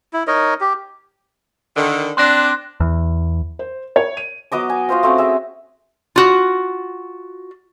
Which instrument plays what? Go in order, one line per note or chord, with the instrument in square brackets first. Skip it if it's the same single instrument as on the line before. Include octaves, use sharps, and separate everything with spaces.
[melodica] E4
D#4 A#4 C#5 D#5
G4
[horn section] D3 D#3
[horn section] C4 D4 [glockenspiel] C6 F#6 A#6
[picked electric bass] E2
[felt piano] C5
C#5
D#7
[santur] F#3 B3 D#5 D6
G#5
F4 F#4 C5 F5
A3 C4 C#4 F#4
G#4 E5
[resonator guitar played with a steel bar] F4 F#4